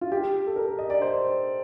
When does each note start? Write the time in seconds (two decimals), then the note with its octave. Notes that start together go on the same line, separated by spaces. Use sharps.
0.01 F4
0.12 G4
0.47 A4
0.56 A#4
0.79 D#5
0.90 D5
1.02 C5